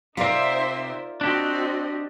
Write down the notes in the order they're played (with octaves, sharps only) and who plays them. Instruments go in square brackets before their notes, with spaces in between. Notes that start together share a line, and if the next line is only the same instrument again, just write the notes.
[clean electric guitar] C3 C4 [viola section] D#4 C5 E5 [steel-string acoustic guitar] F4 A#4 D5
[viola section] C4 F#4 D#5 [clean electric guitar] D4 G4 G5